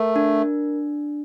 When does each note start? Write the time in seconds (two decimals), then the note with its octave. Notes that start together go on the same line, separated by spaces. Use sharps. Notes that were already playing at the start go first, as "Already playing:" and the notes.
Already playing: A3 A#4
0.16 D4